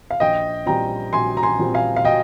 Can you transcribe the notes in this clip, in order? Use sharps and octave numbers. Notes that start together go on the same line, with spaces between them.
F5
A#1 D#5 G5
A#2 G3 C4 G5 A#5
A#1 G#5 C6
A#5
G#5 C6
A#2 G3 C4
F5 G#5
F5
D#5 G5